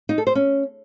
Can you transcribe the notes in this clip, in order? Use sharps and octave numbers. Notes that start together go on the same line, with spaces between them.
D#4
A4
C5
C#4